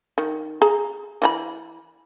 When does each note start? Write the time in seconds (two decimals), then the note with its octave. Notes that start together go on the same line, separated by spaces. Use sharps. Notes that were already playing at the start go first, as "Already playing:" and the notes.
0.18 D#3
0.62 G#4 A#5
1.22 E3 E4 B5